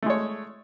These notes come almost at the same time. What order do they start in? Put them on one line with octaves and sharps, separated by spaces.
A3 G#3 C#5